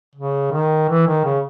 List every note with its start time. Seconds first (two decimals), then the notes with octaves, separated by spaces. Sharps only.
0.15 C#3
0.52 D#3
0.89 E3
1.07 D#3
1.25 C#3